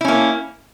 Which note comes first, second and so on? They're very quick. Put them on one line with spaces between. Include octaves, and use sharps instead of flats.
E4 C#4 A#3